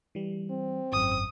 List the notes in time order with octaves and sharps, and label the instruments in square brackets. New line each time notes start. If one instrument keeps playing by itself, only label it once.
[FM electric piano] E3 G3
[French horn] C4
[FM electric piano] G#1 F#2 [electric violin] D#6